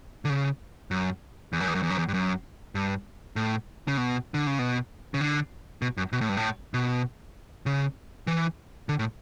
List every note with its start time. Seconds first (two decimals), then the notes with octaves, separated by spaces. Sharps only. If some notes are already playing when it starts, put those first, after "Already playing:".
0.25 D3
0.30 C#3
0.91 F#2
1.53 E2
1.60 F#2
1.68 E2
1.75 F#2
1.83 E2
1.90 F#2
1.98 E2
2.08 G2
2.14 F#2
2.75 G2
3.36 A2
3.88 C#3
3.97 B2
4.34 D3
4.47 C#3
4.59 B2
5.14 C#3
5.21 D3
5.82 B2
5.97 F#2
6.13 B2
6.21 A2
6.29 G2
6.37 A2
6.74 B2
7.66 C#3
8.27 E3
8.89 D3
8.99 A2